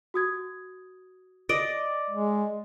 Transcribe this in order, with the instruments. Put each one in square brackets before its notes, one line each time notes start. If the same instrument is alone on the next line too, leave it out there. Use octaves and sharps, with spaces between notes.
[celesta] F#4 D#6 G#6
[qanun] D5 D#5
[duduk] G#3